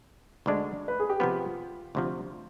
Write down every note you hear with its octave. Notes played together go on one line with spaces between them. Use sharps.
D2 D3 G#3 D4
B4
G#4
G4
C3 F3 B3 F4
D2 C3 F3